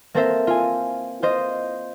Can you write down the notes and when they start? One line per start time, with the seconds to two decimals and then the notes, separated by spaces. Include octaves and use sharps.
0.14 A#3 C4 A4 A#4 C5 E5
0.47 F4 G#5
1.22 F4 C5 D#5